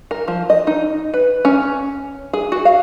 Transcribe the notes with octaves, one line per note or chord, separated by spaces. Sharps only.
A#4
F3
D#5
D#4
B4
C#4
G#4
F#4
F5